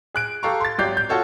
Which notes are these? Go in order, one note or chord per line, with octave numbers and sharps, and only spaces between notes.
G#4 F#6 D7
G4 A4 F5 A#5 C#6
C6 A6
G#1 F#3 G4 D5 G6 C7
G6
F4 F#4 A4 C#5